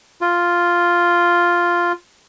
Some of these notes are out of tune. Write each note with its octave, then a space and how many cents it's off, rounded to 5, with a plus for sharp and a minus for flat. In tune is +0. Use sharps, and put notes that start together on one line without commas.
F4 +0